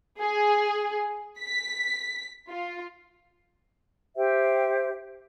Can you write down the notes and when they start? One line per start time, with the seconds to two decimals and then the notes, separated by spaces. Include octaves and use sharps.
0.19 G#4
1.40 B6
2.48 F4
4.17 G4 C5 E5 G5